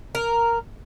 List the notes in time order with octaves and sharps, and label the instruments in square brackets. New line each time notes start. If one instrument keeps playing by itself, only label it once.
[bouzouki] A#4